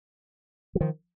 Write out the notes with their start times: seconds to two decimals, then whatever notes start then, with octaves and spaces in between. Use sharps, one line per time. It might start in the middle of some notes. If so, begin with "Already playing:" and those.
0.75 F#3
0.81 D#3 F3